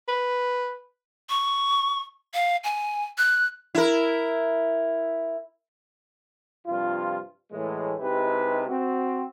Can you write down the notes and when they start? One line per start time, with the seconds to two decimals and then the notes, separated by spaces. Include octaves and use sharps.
0.08 B4
1.29 C#6
2.34 F5
2.64 G#5
3.18 F#6
3.75 E4 A#4
6.67 G2 C3 F3 F4
7.52 A2 E3 G#3
7.99 C3 G#3 D#4 E4 G4 B4
8.68 C4 F#4